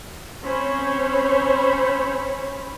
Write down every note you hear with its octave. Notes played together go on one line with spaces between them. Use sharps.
C4 C#4 C5 C#5 B5